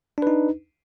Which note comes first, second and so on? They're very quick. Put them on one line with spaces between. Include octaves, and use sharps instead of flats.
D4 B4 D#4